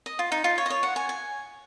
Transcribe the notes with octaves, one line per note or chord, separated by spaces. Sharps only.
D#5
F4
D#4
F4
C#5
D#5
C#5
F#5
G#5
G#5